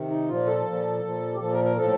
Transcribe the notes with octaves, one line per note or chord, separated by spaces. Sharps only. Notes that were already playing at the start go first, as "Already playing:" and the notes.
Already playing: C3 D#3
D#4
A#2 F3 F4
A4
A#2 F3
A#2 F3
G4
A#2 F3 A4
A#4
A#4
A2 F3 A4